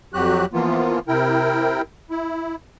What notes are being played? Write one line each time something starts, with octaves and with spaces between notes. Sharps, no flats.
F2 F#3 F#4 G4 F#6
E3 F3 A#3 B3 F4
C3 E4 A#4 G5
E4